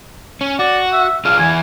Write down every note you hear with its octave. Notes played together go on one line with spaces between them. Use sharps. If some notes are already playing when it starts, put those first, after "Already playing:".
C#4
F#4 D5
E5
D4 F4 G#4 F5
E2 E3 E4 G#5